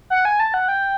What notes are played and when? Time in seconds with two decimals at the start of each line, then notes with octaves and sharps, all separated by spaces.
0.10 F#5
0.25 G#5
0.40 A5
0.54 F#5
0.68 G5